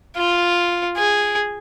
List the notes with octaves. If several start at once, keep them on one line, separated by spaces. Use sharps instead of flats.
F4
G#4